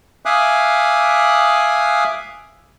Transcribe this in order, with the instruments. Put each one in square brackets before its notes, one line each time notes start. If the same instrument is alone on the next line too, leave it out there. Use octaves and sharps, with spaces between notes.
[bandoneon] E5 F5 G#5 D6 D#6 F#6